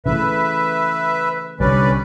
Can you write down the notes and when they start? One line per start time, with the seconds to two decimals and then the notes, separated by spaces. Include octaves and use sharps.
0.06 C#3 E3 A3 B4 E5
1.60 C2 D3 G3 C#4 B4 D5